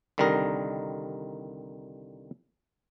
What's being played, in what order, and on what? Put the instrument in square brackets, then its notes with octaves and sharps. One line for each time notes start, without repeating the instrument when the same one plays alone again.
[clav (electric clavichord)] C2 D3 D#3 G3 A#4 D#5